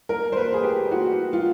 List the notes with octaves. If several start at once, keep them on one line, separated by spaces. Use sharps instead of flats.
A#4
C5
B4
G#4
G4
F#4
F4